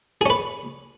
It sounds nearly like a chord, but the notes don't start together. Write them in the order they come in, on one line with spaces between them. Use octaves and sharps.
G#4 C#4 B4